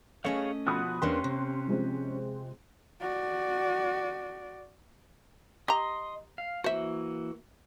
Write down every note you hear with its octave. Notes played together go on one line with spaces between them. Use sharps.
A3 C#4 G#4 C#5 D#5 F5
B2 F3 F#4 B5 D#6 F#6
E2 A#3 C#4 D4 G4 C6
C3
F3 G#3 C4
F#4 D5
G4 D#5 A#5 C6
F5
E3 A#3 F#4 C5 E5